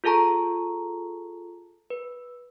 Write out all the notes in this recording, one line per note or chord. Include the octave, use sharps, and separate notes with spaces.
F4 G#4 A4 A5 A#5 C#6
B4